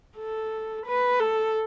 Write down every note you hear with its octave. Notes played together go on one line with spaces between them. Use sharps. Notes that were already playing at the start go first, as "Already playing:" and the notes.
A4
B4
A4